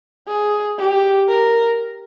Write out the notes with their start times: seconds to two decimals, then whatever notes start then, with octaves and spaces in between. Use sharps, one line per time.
0.28 G#4
0.79 G4
1.29 A#4